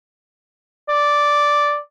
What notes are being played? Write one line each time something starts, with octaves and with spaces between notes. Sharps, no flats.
D5